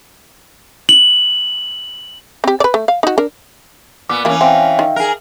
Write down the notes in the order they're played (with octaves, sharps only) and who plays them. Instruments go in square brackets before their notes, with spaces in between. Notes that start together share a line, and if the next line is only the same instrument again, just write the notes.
[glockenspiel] F#7
[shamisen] C4 G4
B4 D5
A3
F5
D#4 F#4
D4 A#4
[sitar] A#2 B3 [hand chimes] D6
[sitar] E3 C#4 [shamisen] A3 A#3
[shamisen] C4 [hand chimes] E5 F5 G5
[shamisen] D#3
[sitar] G#4 A#4